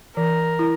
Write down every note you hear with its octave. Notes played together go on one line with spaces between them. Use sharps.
E3 A#4
E4